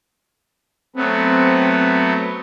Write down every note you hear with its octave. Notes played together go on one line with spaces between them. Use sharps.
F#3 A3 B3 C4